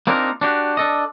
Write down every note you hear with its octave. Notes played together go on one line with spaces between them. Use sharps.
A#3 C4 D4 D#4 F4 A#4
D4 F#4 G4
D4 A4 D#5